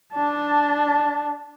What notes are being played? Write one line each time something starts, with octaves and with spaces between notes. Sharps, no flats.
D4 A5